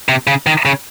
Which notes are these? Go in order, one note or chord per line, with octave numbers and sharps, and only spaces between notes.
C3
C#3
D#3
C#3